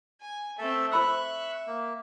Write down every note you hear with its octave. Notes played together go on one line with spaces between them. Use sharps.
G#5
A3 C4 A4 E5
C5 E5 B5 C#6 E6 F#6
A#3